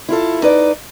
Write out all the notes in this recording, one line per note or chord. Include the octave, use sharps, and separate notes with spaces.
E4 F4 A4
D#4 B4 D5